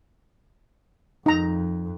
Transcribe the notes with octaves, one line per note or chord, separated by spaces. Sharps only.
F2 D#4 A#5